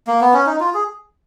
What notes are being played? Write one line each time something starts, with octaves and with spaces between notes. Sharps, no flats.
A#3
B3
C#4
D#4
F4
G#4